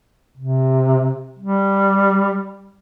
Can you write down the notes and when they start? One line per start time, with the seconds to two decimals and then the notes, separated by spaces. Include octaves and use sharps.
0.38 C3
1.39 G3